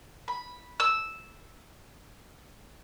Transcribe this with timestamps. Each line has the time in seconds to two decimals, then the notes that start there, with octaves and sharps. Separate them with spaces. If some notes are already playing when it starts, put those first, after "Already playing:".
0.28 B5
0.80 E6